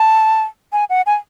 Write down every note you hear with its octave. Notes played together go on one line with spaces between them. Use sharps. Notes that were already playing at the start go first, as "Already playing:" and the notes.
Already playing: A5
G#5
F#5
G#5